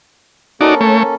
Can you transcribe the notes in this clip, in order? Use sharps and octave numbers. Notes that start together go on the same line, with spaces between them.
A#3 C#4 D#4 F#4 A4 D5
A3 C#5